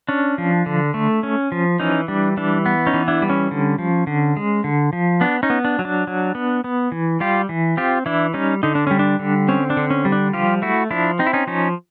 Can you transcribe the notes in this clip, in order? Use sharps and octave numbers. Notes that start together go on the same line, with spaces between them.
C#4 D4
F3
D3
A3
C#4
F3
E3 C#4 D#4
G3 D4
E3 D4
B3
C#4 D#4
E3
D4 E4
G3
C#4
D3
F3
D3
G#3
D3
F3
B3 D4
C#4 D#4
B3
D4
F#3
D4
F#3
B3
B3
E3
G3 F4 G4
E3
C4 F4 G4
E3 D4 E4
G3 C#4 D#4
D3 D#4
D4
G3 C#4
D4
D3
C4 C#4
D4
D3
C#4
G3
D4
F3 F4 G4
A3 E4 F#4
F3 D4 E4
C4 D#4
E4
C#4 D#4
F3 C#4 D#4